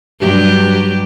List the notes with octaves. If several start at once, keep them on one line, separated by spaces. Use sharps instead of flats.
G2 F#3 G4